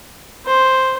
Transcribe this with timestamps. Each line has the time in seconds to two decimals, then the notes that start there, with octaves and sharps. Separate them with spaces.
0.46 C5